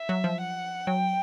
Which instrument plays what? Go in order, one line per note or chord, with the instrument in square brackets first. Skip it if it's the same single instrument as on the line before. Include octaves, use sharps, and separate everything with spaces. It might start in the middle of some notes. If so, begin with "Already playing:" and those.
Already playing: [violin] E5
[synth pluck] F#3
F3
[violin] F#5
[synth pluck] F#3 [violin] G5